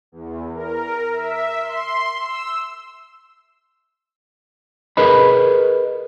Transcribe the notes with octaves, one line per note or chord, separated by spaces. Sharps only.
E2
A#4
E5
C6
E6
G#4 A#4 B4 C#5 D#5 B5